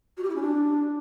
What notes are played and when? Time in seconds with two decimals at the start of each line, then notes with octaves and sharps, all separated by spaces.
0.17 F#4
0.23 G4
0.29 E4
0.35 C#4
0.42 D4